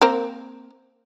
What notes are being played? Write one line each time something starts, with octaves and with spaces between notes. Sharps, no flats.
A#3 C4 A#4